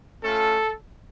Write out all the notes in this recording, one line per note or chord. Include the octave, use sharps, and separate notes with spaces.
A3 C#4 F4 A4